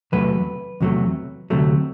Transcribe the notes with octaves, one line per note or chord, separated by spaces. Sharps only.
E2 C3 F#3 A3 B4
E2 C3 F#3 A3
D2 C3 F#3 A3